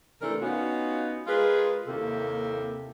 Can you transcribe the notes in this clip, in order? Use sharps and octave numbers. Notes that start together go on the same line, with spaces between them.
C3 E3 A3 D4 A4 A#4
B3 C#4 D#4 F4 F#4
G#3 F4 G#4 A#4 B4
D#2 C3 A#3 E4 G4 A4